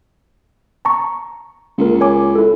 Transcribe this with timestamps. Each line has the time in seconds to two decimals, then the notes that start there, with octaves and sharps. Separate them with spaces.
0.85 A5 A#5 C#6
1.78 C#2 A#3 A#4
2.01 C#5 G#5 D6
2.36 E4 A4